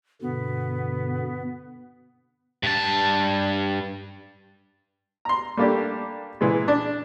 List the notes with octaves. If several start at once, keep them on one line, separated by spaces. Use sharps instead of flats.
G2 B2 D3 B3
G2 A5
A#5 C6
G3 A3 A#3 D4 G4
A#2 E3 G#3
D4